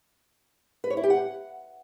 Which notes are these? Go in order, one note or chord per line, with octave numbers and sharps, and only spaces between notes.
B4
C#5
E4
G4
F#5